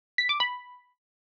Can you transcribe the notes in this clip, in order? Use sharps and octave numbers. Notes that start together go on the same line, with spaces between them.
B6
D6
B5